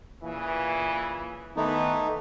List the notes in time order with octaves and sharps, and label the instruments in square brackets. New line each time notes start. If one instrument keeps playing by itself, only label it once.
[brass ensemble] A#2 C#3 E3
[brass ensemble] D#3 E3 B3 [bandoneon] A3 D#4